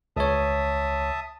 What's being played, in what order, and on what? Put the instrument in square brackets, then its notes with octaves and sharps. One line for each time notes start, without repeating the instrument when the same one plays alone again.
[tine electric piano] C#2 C#5 [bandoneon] E5 A5 D#6